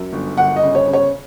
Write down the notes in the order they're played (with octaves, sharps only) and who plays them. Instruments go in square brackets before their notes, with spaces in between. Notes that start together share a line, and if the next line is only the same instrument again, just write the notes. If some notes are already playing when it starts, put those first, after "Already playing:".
Already playing: [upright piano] F#2
G1
G1 F#5
D#5
C#3
C#5
C#3
C#5